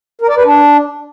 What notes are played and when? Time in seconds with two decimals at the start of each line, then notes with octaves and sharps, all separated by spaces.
0.22 A#4
0.29 D5
0.37 B4
0.45 D4